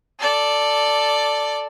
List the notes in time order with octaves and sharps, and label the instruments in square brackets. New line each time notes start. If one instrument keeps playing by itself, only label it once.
[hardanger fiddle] A4 D5